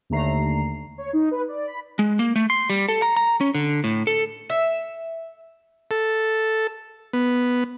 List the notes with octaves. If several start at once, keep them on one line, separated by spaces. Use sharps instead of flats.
D#2 D3 A3 A#5 C7
C#5
D#4
B4
D5
B5
G#3
A#3
A3
C6
G3
A4
A#5
A#5
C#4
D3
A2
A4
E5
A4
B3